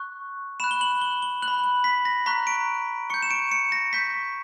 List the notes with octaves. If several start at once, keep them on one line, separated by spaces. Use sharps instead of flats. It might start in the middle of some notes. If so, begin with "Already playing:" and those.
Already playing: C#6 F#6
B5 F#6 E7
G7
F#7
G7
G7
F#6 F#7
B5
F#7
B6
A#6
A#5 C#6 F#6 B6
D7
C#6 G6 C#7
E7
D7
C#7
A#6
C#6 G6 B6